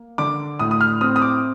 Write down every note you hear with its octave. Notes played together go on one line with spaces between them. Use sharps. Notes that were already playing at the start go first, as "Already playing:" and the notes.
Already playing: A#3
D3 D6
A2 D#6
D#6
F6
C4 D#6
D#6
D6